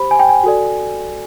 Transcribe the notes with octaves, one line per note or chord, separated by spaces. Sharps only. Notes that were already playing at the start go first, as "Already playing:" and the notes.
Already playing: G4 C5 B5
G#5
G5
G#5
F#4 A4 D5